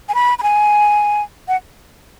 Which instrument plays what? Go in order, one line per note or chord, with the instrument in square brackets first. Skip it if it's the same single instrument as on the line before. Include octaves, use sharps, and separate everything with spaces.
[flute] G#5
B5
B5
G#5
F#5